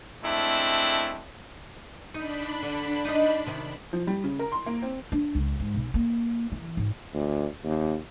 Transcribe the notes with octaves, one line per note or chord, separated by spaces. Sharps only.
G#3 A3 C4 D4 E4
D4 D#4 B5
D3
D#4 D#5
C3 D#3
F3
G3
C#3
A#4
C6
A#3
C4
D4
C#2
G#2
B1
A#3
E3
G#1
D2
D#2